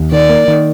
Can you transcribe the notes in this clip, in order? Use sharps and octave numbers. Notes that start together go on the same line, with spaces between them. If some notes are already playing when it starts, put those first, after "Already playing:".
Already playing: D#2
D#3 D5
A#3
D#3